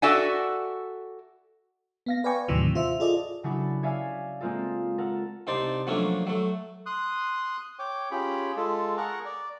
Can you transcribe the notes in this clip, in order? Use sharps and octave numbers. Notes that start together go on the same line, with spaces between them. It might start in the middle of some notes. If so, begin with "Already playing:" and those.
F#4 A4 D5 E5 F#5 G#5
B3 F5 A#6
B4 D5 F5 G5 G#5 C#6
D#2 A2 C3 D#3 E3 F#3
F4 C5 E5
F4 G#4 A4 D5 D#5
C#3 F#3 D4 E4 F#4 A4
C#5 D5 E5 F5 G#5
G#3 A#3 C4 F4 A4
A4 A#4 F#5
C2 D#4 C5 D5 A5
F3 F#3 A3 A#3 C#4 D4
F#3 A3
C6 D#6 F#6
C#5 G5 D6
C#4 F4 G4 G#4 G5 B5
G#3 F4 A4
G#4 A#4 F#5 A#5 C#6
D5